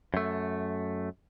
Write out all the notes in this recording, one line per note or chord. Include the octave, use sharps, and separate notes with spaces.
F#2 A3